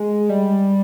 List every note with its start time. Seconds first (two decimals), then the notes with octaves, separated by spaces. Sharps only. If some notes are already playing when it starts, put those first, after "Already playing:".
Already playing: G#3
0.29 G3